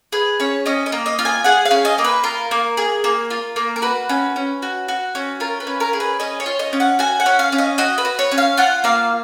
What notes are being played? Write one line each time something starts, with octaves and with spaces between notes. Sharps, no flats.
G#4 B4
C#4 C#5
C#4 D#5
D#5
A#3
D#5
F4
G#5
G#4 F#5
F5
C#4
D#5
A#3
B4
F4 A#4
A#3
G#4
A#3
F4
A#3
A#4
F#4 B4
C#4
C#4
F#4
F#4
C#4
F4 A#4
B4
C#4
A#4
G#4
B4
C#4 D#5
C#5
F4
D#5
C#4
F#5
F#4 G#5
F#5
C#4
F5
C#4
D#5
F#4 D#5
B4
F#4
C#5
C#4
F5
F4 F#5
A#3 F5